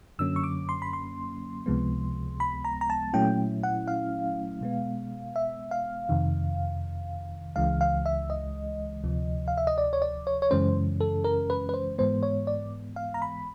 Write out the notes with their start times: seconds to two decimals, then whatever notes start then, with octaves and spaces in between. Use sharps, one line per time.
0.19 F#2 D3 F#3 A#3 C#4 E6
0.36 C#6
0.44 D6
0.69 C6
0.82 B5
0.93 C6
1.66 C#2 C3 F3 G#3 B3
2.40 B5
2.64 A#5
2.81 A#5
2.90 A5
3.13 A#2 F#3 A3 C#4 E4 G5
3.63 F#5
3.88 F5
4.61 B2 G#3 B3
5.36 E5
5.71 F5
6.09 F2 C3 D#3
7.56 C#2 C#3 E3 G#3 F5
7.81 F5
8.06 E5
8.30 D#5
9.04 D2 C3 F3
9.48 F5
9.57 E5
9.67 D#5
9.78 D5
9.93 C#5
10.02 D5
10.27 C#5
10.42 C#5
10.51 F#2 C#3 E3 G#3 C#4 C5
11.00 A4
11.24 A#4
11.50 B4
11.69 B4
11.74 C5
11.98 G#2 E3 G#3 B3 C5
12.23 C#5
12.47 D5
12.96 F5
13.14 A#5
13.22 B5